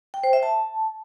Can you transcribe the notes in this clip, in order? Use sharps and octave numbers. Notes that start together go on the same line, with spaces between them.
G5
C5
E5
A5